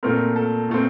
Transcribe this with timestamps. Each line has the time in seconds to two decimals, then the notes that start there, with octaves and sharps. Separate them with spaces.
0.03 A#2 A3 C4 A#4
0.36 A4
0.69 A#2 A3 C4